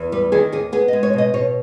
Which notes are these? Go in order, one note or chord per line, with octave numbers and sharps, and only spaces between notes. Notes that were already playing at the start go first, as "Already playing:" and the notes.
Already playing: E2
G3 B4
D#3 G#4
D#2 G#4
B3 G#4
D#5
G#3
C#5
B2 D#5
B2 C#5